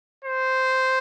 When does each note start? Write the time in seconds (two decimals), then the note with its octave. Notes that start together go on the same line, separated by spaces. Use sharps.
0.25 C5